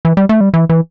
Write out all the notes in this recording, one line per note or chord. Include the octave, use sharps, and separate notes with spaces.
E3
G3
A3
G3
E3
E3